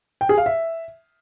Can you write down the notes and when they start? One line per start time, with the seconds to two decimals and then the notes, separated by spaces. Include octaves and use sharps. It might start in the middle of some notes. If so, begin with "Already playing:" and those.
0.21 G5
0.29 G#4
0.38 F5
0.46 E5